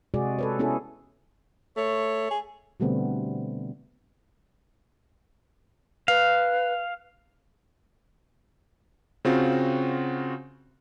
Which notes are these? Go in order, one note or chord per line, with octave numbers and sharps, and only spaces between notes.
C3 G#3 F#4 G#4 D5
A4 B4 C#5
B3 C#4 E4 G#4 A4
A3 C#5
G#4
B2 D3 G3 A3 B3 C4
B4 F5
C#3 C4 F4 F#4